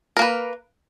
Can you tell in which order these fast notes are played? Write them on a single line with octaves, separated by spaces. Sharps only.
A#4 A#3 B4